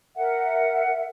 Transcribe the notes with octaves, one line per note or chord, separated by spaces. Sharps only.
A#4 E5 F#5